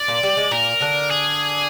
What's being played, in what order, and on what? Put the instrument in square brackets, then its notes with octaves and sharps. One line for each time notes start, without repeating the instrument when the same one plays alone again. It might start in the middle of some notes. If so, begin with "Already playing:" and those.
Already playing: [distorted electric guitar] D5
[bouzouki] A#2 A#3
G3
G#3
[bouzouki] A#2 A#3 [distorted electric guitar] A#4
[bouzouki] D3 D4
[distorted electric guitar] G#4